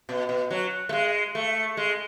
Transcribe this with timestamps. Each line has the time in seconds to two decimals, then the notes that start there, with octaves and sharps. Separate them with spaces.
0.09 B2
0.29 B2
0.51 F#3
0.89 A3
0.93 G#3
1.35 A3
1.77 G#3